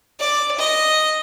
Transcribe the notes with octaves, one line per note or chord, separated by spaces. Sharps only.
D5
D#5